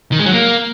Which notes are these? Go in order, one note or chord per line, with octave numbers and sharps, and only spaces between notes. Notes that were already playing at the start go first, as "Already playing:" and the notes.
D#3
G#3
F#3
A#3